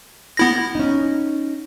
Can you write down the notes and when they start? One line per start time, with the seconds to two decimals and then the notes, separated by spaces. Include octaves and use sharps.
0.37 B3 E4 A#6
0.75 C#4 D#4